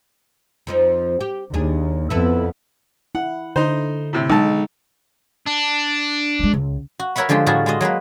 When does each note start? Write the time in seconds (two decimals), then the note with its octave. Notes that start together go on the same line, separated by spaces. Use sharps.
0.67 F2 F3 D#4
1.21 G4
1.54 D#2 D4 G#4
2.10 F2 B3 E4 A4 B4
3.15 E4 F#5
3.56 D3 D#4 C5
4.13 A2 C3
4.30 B1 G#3 D#4 A5
5.46 D4
6.39 G#3 A3
6.54 C#2
6.99 F#4
7.16 A#4 B4 C#5 E5 F#5 B5
7.29 D3 F3 G#3 D4 G4
7.46 A2 G3 F4 F#4 G#4 A5
7.66 G#3 F4 F#4 D#5
7.81 F#3 G#3 A#3 B4